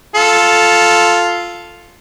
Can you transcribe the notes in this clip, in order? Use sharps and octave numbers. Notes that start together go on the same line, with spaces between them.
F4 A4